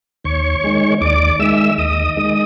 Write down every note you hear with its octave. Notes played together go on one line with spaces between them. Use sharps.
D#2 C#5 C#6
D#3 G#3
D#2 D5 D6
D#3 G#3 E5 E6
D#2 D#5 D#6
D#3 G#3